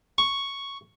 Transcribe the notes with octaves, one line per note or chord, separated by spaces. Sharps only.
C#6